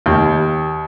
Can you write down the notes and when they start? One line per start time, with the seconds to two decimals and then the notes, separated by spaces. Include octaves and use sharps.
0.06 D#2